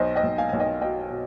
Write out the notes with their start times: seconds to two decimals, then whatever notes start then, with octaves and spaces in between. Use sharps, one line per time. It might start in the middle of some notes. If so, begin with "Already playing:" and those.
Already playing: B1 C5 D#5
0.15 D#5 G5
0.23 B1
0.38 F5 G#5
0.49 B1 G#5
0.60 D#5 G5
0.81 B2 D#5 G5
1.10 B2